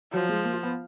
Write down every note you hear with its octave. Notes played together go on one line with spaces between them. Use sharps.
F3 F#3
G#3
A#3
F4
B3